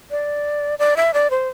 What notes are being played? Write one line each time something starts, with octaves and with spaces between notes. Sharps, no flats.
D5
D5
E5
D5
C5